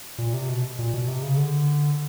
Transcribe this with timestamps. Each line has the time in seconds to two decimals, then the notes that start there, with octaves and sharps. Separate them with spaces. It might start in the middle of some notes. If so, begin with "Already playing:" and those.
0.18 A#2
0.33 C3
0.49 B2
0.79 A#2
0.94 B2
1.08 C3
1.23 C#3
1.37 D3